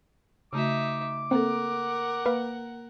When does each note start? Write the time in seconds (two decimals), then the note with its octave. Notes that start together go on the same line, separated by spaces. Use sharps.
0.53 C#3 A3 D#4 F#4 E5 D6
1.31 A#3 C4 A4 A#4 F#5
2.26 A#3 B4 F5